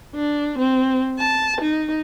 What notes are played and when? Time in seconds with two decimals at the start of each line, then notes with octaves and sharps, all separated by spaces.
0.15 D4
0.59 C4
1.19 A5
1.61 D#4